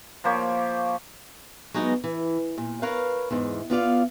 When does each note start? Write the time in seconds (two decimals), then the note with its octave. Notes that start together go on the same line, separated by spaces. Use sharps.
0.24 F3 A#3 G4 C#5
1.74 F#3 G#3 B3 D#4
2.04 E3
2.58 A#2
2.82 A#4 B4 C#5 F5
3.31 E2 G#2
3.70 B3 F4 D5 F5